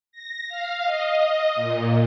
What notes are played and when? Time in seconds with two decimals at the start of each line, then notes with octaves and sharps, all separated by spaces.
0.12 A#6
0.48 F5
0.83 D#5
1.25 D#5
1.55 A#2